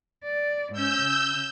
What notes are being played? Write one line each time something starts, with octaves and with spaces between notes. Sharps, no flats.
D5
G#2 C#4 E6 G6
C#3